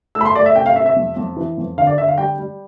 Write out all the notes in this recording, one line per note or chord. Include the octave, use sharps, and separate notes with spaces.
A3 E6
B5
C6
A3 D5
E5
C3 G5
F5
C3 E5
E5
F2
F2
E3
F2
D3 F5
D5
D3 E5
F5
G3 G5
G3